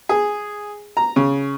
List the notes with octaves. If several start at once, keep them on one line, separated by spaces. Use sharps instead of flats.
G#4
A#5
C#3